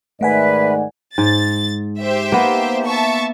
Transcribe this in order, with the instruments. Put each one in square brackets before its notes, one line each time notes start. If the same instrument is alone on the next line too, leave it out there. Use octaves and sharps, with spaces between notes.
[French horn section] G#2 D#3 D5 [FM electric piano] A3 F#5 G#5 [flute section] B4 E5
[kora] G#2 [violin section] A6
[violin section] G4 C5 E5
[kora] A#3 B3
[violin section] E5 A5 C#6